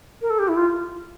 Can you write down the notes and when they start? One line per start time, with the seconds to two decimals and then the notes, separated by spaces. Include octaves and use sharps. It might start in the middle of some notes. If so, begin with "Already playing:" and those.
0.22 A#4
0.30 A4
0.39 G4
0.48 E4
0.56 F4